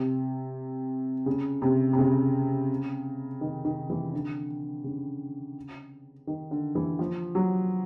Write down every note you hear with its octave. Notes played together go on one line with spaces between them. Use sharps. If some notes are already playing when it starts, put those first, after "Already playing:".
Already playing: C3
C#3
C3
C3
C#3
D#3
D#3
E3
D3
C#3
D#3
D3
E3
F3
F#3